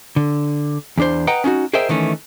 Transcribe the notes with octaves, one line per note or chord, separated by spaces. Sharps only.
D3
E2 D4 C5
B4 D#5 F#5 G5 A#5
C#4 D#4 F4 F#4
G#4 A#4 C5 D#5 E5 G5
D#3 E3 A3 C#4